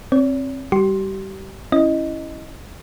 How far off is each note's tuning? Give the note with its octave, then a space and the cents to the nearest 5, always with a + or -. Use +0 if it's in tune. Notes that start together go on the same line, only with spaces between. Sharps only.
C4 +25 C#5 +45
G3 +0 G4 -35 C6 +10
C#4 +0 E4 +0 D#5 +0